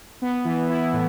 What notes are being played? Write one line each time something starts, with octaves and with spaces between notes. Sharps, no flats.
B3
E3
E4
A2